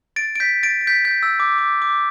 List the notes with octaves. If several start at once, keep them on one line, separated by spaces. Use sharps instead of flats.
A6 D7
D7
G6 B6
A6 D7
A6
G6 B6
G6
E6
D6
D6
D6